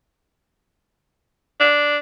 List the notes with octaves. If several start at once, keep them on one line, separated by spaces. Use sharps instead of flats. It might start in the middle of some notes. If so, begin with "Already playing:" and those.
D4